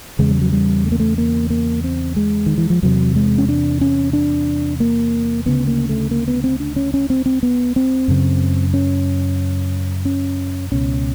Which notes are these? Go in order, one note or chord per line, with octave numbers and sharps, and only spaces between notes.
E2 C#3 G#3
G3
F#3
G3
A3
A#3
A3
A#3
A#3
C4
G#3
D#3
E3
F3
E2 C3 F#3
G#3
C#4
D4
C#4
D4
A#3
D2 C#3 B3
A#3
A3
A#3
B3
C4
D4
C#4
C#4
C4
C4
B3
C4
F#2 C#3
C#4
C#4
C#2 B2 C#4